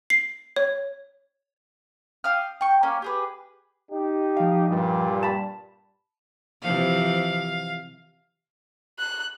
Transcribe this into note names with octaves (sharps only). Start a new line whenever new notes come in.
C7
C#5
F5 G5 D#6 F6
G5 C#6
A#3 C#4 G#5
G4 G#4 B4
D#4 G4
F3 F5
G2 A#2 G3
A5 B5
C3 E3 F3 F5
F#6